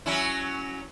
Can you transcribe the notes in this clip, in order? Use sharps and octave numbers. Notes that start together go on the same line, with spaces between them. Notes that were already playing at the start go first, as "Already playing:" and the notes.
F#3 C#4 E4